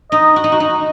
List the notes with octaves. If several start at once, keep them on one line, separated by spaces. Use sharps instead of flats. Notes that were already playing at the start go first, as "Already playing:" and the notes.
D#4 D#5
F#4
D#4
F#4
D#4